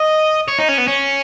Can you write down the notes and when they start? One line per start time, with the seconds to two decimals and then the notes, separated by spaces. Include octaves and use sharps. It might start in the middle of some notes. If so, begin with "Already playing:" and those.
Already playing: D#5
0.48 C#5
0.58 D#4
0.69 C#4
0.78 B3
0.87 C#4